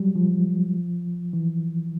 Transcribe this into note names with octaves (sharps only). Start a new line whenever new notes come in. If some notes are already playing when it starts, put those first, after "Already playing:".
Already playing: F#3 G3
F3
E3